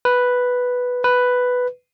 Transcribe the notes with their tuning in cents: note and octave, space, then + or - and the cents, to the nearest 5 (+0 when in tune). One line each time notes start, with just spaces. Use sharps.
B4 +0
B4 +5